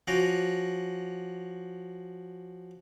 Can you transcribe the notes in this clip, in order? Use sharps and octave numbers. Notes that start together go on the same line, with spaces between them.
F3 C#4 F#4 A#5 D6